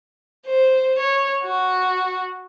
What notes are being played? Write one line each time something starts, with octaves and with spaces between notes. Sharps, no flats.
C5
C#5
F#4